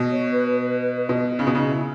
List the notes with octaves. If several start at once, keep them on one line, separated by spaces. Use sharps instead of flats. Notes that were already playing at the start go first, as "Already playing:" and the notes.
Already playing: B2
C#5
B4
B4
B4
B4
B4
B2 D#5
C#3 D#4
B2
C#3 D#4
E4